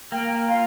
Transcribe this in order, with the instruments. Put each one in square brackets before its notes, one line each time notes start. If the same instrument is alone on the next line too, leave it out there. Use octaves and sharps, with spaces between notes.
[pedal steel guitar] A#3 [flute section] G5
[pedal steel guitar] F4 [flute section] F5